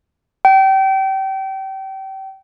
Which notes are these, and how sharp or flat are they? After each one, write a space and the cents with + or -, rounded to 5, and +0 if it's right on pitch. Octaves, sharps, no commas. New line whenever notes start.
G5 -30